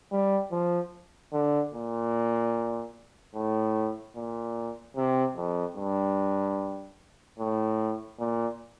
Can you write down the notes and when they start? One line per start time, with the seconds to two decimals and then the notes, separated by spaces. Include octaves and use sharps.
0.12 G3
0.51 F3
1.33 D3
1.74 A#2
3.35 A2
4.16 A#2
4.96 C3
5.36 F2
5.76 G2
7.39 A2
8.19 A#2